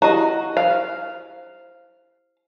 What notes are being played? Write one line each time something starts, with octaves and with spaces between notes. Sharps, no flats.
E4 F#4 G4 D#5 A#5
C5 F5